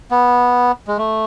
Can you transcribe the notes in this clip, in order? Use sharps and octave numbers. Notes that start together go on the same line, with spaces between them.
B3
G#3
A3